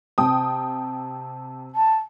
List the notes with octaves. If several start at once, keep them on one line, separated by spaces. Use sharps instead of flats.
C3 G5 A5 D#6
A5